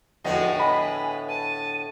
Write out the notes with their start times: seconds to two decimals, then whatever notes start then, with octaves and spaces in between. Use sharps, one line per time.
0.24 F1 A2 D3 B3 F#4 G#4 D#5 G5
0.59 B4 D#5 G#5 B5
1.29 A5 D#7